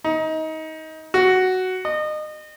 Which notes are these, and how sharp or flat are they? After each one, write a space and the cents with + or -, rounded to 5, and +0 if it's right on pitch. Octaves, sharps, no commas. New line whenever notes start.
D#4 +25
F#4 +5
D#5 -30